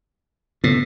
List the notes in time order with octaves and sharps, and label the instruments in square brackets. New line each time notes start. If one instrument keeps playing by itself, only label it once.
[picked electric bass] G1 C#3 B3 [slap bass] A2